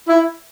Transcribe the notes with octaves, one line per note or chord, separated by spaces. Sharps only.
E4